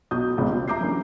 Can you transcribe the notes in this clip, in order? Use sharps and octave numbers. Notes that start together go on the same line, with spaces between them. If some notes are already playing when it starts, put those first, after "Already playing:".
B1 F#4 D#6 G6
G#1 C#2 B2
G3
E5 A#5 D6 G6 C7
E3 F#3 A#3 C#4 D4